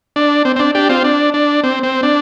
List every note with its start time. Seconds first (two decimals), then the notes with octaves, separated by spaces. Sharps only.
0.16 D4
0.45 C4
0.56 C4
0.59 D4
0.75 D4 G4
0.89 C4 F4
1.04 D4
1.34 D4
1.63 C4
1.83 C4
2.03 D4